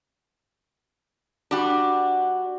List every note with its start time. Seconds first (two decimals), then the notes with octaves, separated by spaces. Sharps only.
1.51 G3 D4 F#4